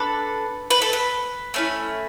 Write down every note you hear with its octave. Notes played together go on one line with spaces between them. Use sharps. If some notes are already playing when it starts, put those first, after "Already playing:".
Already playing: D4 A4 B4
B4
A4
B4
A3 C#4 E4